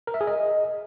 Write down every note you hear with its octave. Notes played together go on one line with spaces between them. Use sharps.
A#4
E5
G#4
D#5